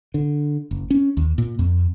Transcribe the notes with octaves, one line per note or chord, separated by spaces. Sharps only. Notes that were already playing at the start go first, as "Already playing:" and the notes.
D3
F#1
C#4
D#2
A#2
F2